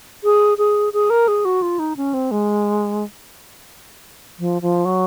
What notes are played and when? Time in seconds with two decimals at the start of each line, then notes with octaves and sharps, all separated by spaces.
0.24 G#4
0.58 G#4
0.93 G#4
1.10 A#4
1.28 G#4
1.45 F#4
1.62 F4
1.79 D#4
1.97 C#4
2.14 C4
2.31 G#3
4.39 F3
4.62 F3
4.85 F#3